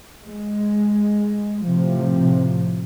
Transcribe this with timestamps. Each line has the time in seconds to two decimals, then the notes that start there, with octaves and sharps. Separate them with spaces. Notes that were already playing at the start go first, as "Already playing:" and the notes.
0.25 G#3
1.66 A2 C3 F3